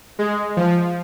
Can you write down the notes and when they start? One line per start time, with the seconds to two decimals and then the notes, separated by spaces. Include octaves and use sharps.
0.19 G#3
0.57 F3